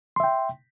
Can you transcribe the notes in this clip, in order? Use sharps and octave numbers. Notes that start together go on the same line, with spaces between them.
E5 G5 C6